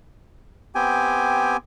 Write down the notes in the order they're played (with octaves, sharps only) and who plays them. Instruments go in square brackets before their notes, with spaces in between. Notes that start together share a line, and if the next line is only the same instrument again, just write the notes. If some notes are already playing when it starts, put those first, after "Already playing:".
[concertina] B3 C4 G4 G5 G#5